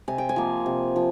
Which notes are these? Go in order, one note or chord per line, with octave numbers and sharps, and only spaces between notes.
C3 G#5
G5
G#5
F3 A#3
C3
F3